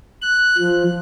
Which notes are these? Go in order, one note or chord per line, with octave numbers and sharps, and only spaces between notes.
F#6
F3